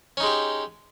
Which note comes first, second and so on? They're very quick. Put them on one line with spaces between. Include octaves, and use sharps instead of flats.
C#4 D#4 G#3 G4